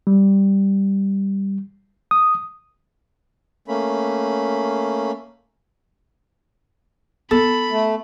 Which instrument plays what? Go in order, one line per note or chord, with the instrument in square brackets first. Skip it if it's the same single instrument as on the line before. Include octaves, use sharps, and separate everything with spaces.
[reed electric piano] G3
D#6
[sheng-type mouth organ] A3 A#3 C#4 B5
[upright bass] B3 [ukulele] A4 [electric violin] B5
[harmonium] A3